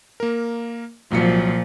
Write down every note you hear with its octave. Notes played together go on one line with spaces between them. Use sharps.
A#3 A#4
C2 A#2 F3 F#3 C#7